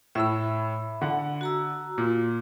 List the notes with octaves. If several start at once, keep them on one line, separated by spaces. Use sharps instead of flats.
A2 E5 B5 E6
D3 F#5
F#4 A#5 E6
A#2